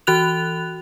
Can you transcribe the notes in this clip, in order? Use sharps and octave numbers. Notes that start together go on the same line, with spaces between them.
E3 F#4 F#6 F7